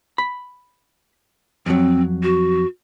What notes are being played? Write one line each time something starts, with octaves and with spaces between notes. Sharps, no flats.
B5
F2 F#3 C4
F#4